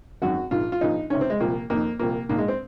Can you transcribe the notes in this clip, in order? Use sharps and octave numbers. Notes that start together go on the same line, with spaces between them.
G#1 F#2 D#3 F#4
A#1 G#2 D#3 F4
F4
A#1 A#2 F3 D#4
C#2 C3 D#3 C#4
C4
G#3
C2 A#2 F3 A#3
F2 D#3 A#3
C2 A#2 F3 A#3
A#1 G#2 D#3 A#3
G#3
C4